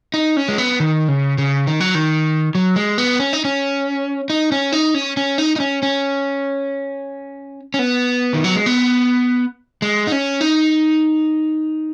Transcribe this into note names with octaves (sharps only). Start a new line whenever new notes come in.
D#4
C#4
G#3
B3
D#3
C#3
C#3
D#3
F#3
D#3
F#3
G#3
B3
C#4
D#4
C#4
D#4
C#4
D#4
C#4
C#4
D#4
D#4
C#4
C#4
C#4
B3
D#3
F#3
G#3
B3
G#3
D#4
C#4
D#4